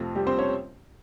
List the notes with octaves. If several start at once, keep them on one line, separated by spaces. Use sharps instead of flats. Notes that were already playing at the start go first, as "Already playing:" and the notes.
Already playing: F2 C3 F3 A3
G3 G4
C4 C5
C#4 C#5